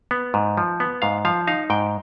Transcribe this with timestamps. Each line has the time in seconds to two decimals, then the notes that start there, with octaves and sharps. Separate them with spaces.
0.11 B3
0.34 G#2
0.57 F3
0.80 B3
1.02 G#2 F5
1.25 F3 F5
1.47 D#4 F5
1.70 G#2 G5